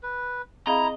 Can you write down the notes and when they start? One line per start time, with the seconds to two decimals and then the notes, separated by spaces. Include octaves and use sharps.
0.03 B4
0.67 C4 E4 G#4 D#5 F5 A#5